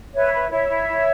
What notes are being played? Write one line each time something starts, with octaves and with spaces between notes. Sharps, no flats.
B4 C#5 E5
B4
E4 C#5 E5
E4
E4